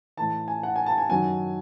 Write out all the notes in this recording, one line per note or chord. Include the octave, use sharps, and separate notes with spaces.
A2 E3 A5
G#5
F#5
G#5
A5
G#5
F#2 D#3 F#3 G#5